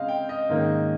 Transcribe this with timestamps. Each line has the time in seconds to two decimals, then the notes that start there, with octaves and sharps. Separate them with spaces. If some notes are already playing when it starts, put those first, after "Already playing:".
Already playing: C#3 G#3 C4 D#5 F5
0.08 G5
0.29 D#5
0.49 G#2 D#3 A#3 C#4